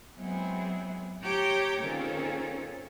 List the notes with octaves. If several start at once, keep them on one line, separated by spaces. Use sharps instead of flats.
F#3 G#3 B3 C4 E4 G#4
G4 C#5 G5 A#5 D6 G6
A#2 D#3 C4 C#4 G#4 A4